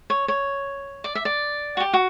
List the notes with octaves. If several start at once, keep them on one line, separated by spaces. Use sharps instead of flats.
C#5
C#5
D5
E5
D5
F#4
G4
F#4